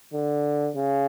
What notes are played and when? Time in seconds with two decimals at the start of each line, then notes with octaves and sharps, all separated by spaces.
0.14 D3
0.76 C#3